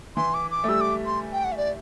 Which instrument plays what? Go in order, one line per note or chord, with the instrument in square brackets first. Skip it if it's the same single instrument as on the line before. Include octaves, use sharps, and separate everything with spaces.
[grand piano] E3 [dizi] C6
[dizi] D6
D6
[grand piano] A3
[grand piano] G3 [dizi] E6
[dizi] D6
C6
G5
F#5
E5
D5